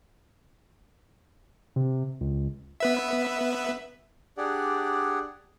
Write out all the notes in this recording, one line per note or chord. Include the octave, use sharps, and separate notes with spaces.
C3
C#2
B3 B4 E5
D4 G4 G#4 D5 F#5